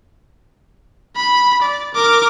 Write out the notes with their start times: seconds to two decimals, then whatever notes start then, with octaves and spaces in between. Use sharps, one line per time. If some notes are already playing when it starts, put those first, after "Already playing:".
1.16 B5
1.62 D5
1.94 A#4 D6